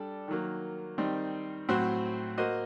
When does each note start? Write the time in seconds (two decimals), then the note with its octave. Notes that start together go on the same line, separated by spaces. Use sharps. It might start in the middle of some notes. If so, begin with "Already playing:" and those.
Already playing: G3 D4 A4
0.28 D#3 F#3 A#3
0.98 D#3 G3 C4 D#4
1.68 A2 F#3 C4 F#4 C5
2.38 A#3 F#4 C5 D#5